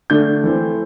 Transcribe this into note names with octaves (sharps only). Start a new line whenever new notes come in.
D3 A3 D4 G6
E3 A3 C4